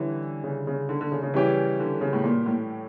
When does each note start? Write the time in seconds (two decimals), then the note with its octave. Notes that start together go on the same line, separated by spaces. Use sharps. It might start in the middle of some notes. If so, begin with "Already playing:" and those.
Already playing: D3 E3 G3 C#4 E4
0.44 C#3
0.67 C#3
0.89 D3
1.01 D3
1.12 C#3
1.23 C#3
1.34 E3 G3 C#4 G4
1.80 D3
2.01 C#3
2.13 A2
2.24 A#2
2.46 A2